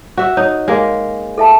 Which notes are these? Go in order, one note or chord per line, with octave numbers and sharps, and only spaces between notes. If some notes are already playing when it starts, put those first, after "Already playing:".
F#4 E5
D#4 C#5
G#3 A#3
A4 E5 A5